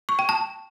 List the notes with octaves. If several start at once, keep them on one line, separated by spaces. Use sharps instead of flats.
C#6
G5
A5